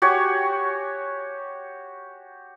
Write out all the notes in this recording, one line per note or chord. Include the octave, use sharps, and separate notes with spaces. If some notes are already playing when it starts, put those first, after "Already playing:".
F#4 G4 C#5 G#5